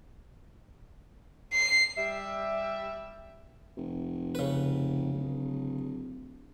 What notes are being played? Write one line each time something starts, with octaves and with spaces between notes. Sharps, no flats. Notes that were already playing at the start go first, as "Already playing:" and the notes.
C7
G3 E5
F1
C#3 B4
D1